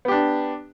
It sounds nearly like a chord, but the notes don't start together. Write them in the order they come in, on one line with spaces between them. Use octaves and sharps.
B3 G4 D4